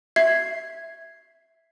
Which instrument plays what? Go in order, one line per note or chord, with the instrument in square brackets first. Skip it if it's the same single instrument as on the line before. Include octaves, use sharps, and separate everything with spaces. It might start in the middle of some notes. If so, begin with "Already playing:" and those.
[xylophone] E5 G#6 C7